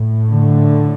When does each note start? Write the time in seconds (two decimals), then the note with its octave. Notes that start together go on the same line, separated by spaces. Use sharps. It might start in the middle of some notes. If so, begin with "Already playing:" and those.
Already playing: A2
0.30 D3